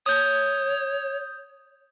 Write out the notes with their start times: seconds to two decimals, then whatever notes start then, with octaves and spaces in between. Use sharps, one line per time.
0.06 C#5 D#6 G6